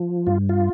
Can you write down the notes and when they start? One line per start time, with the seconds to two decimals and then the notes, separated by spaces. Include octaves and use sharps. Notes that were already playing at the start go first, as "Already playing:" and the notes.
Already playing: F3
0.26 G2 F4
0.49 F4